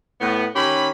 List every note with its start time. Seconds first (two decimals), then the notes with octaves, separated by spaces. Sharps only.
0.21 A2 B3
0.56 D#3 C#4 G4 B5